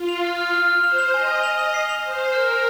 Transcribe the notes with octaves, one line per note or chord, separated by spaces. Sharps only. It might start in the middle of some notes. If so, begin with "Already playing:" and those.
Already playing: F4
F7
F6
F6
F6
F6
C5 F7
F7
D#5 G#5
G#5
F7
F7
D#5 C7
F7
C5 D#6
D#6
A#4 F6
F6